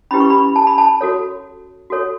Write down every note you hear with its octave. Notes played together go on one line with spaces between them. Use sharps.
C#4 E4 G4 B4 B5
C#6
B5
A5
B5
A5
F#4 A4 C#5
F#4 A4 C#5